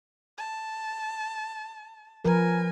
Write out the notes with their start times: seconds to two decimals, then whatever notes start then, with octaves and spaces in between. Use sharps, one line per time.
0.38 A5
2.25 F3 A#4 B4 G#5